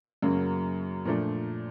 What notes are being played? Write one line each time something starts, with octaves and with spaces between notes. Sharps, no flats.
F#2 C#3 F#3 A#3
A#2 F3 A3 D4